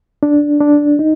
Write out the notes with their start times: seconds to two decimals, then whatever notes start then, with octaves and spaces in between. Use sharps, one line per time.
0.23 D4
0.60 D4
0.99 D#4